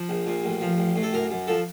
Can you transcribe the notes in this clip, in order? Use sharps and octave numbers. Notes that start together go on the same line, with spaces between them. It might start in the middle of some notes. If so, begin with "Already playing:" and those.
Already playing: F3
A#1
A#2
A1
F3
A1
A2
A4
F#2 A#4
F#2
F3 A4